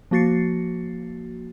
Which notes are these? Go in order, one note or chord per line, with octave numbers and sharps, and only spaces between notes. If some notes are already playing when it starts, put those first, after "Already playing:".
F3 A#3 F#4 A6 C7 C#7